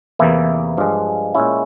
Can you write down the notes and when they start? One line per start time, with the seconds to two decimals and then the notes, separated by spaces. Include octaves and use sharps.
0.19 E2 C3 E3 A#3 E4
0.77 G2 F3 G#3
1.34 A#2 G#3 C#4 E4